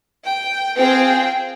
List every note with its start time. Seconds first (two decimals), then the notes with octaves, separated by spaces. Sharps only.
0.25 G5
0.78 C4 F4 G#4 G5